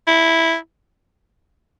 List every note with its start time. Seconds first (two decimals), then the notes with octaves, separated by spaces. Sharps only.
0.08 E4